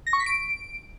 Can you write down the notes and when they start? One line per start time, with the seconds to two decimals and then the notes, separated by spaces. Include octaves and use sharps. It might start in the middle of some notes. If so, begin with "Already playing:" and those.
0.07 A#6
0.13 C#6
0.20 B6
0.26 D7